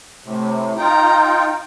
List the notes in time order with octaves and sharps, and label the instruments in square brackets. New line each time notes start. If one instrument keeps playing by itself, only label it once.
[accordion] A2 C3
[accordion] D#4 F4 G5 [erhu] A#5